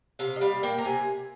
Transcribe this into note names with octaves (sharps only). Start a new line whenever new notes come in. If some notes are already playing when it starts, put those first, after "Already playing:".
C3 F5
D#5
G3 F5
A#3 G5
A#5
C3 G#5